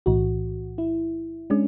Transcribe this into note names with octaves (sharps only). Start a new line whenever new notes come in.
B1 A2 E3 F#4
E4
G#3 C#4 D4